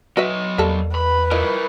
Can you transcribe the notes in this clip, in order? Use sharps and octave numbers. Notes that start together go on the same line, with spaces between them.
F#3 F#4 B4 D#5 E5
E2 G3 A#3 A4
B4 B5
F3 E4 A#4 D#5